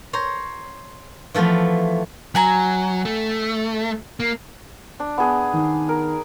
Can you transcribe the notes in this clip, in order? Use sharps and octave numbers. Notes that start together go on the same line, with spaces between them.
C5 C#5 A#5
E3 F3 A3 B3 F4
F#3 F#5 G#5 A#5
A3
A#3
D4
B3 G#4
D#3
A#4